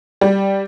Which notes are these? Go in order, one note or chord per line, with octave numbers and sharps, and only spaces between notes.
G3